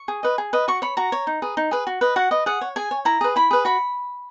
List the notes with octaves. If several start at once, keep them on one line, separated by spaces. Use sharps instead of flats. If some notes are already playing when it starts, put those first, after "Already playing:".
Already playing: C#6
G#4
B4 D#5
G#4
B4 D#5
F#4 C#6
C#5 B5
F#4 A#5
C#5
D#4
G#4 B4
D#4
G#4 B4
F#4
B4 D#5
F#4 F#5
B4 D#5
G#4 F#5
C#5
G#4 G#5
C#5
E4 A#5
G#4 B4
E4 B5
G#4 B4
F#4 B5